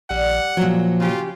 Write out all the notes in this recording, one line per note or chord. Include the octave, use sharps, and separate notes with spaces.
A#1 G3 F#5
A#2 F3 F#3
C#3 F4 G4